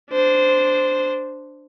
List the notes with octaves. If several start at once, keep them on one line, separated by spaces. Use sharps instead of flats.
D4 C5